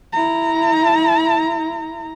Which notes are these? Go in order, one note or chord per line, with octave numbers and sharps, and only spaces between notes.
E4 A#5